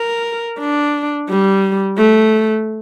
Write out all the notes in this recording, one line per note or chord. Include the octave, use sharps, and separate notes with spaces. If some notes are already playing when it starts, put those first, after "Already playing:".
Already playing: A#4
D4
G3
A3